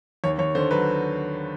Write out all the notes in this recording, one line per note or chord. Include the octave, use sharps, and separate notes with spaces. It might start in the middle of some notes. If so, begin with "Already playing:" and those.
D#2 C#5
D#2 C#5
D3 C5
F#3 B4